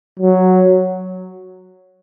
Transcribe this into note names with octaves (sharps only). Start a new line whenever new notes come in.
F#3